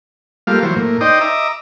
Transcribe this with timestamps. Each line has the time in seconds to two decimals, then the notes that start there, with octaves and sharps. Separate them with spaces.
0.47 G3 A3 A#3 F4 F5
0.63 E3 F#3 C5
0.76 A2 A#3
1.01 D#4 C5 D5 D#5 G5
1.21 D#5 E5 A#5 D6